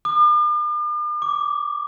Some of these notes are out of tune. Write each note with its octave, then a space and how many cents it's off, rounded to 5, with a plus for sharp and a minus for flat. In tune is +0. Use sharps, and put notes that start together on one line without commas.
D6 +45
D6 -15